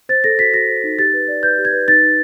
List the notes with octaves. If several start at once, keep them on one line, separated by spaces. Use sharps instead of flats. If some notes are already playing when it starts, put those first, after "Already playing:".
C5 A6
A4 A#6
F#4 B6
F#4 A#6
C5
D#4
G4 A6
B4
D5
B4 G6
G4
G#6
B4
D#4 A6
D#4